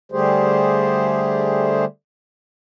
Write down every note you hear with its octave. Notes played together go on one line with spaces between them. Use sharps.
D3 G3 A3 G4 G#4 C5